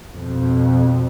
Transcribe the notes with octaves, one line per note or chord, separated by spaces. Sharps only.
F2 B2